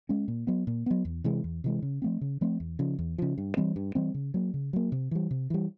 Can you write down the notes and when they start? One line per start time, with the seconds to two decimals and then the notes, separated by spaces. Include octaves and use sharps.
0.09 G#3 C#4
0.28 A#2
0.47 F#3 B3
0.67 A#2
0.86 F#3 B3
1.05 E2
1.24 C3 E3 G#3
1.44 E2
1.64 C3 E3 G#3
1.82 C#3
2.02 F3 A3 C4
2.21 C#3
2.41 F3 A3 C4
2.60 E2
2.79 C#3 F3
2.99 E2
3.18 C#3 F3
3.38 G2
3.57 E3 G3 C4
3.76 G2
3.95 E3 G3 C4
4.14 C#3
4.34 F#3 A#3
4.54 C#3
4.73 F#3 A#3
4.92 C3
5.11 E3 G3
5.31 C3
5.50 E3 G3